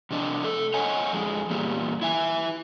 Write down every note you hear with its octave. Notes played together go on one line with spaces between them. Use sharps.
C3 F3 D4 D#5
A3 A4
C5 C#5 D#5 F#5 G#5
F2 G#3
E2 A#2 G3
E4 E5 G#5